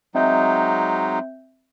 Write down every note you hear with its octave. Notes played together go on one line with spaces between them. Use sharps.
F#3 G#3 C4 D#4 E5 G6